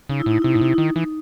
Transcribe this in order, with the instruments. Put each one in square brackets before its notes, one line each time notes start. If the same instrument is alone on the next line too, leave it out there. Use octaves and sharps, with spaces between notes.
[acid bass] C#3 [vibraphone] D#4
[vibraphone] E4
[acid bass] A2 [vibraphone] D#4
[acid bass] C3 [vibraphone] E4
[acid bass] A2 [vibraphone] D#4
[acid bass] C3 [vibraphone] E4
[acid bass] D#3 [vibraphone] D#4
[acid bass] E3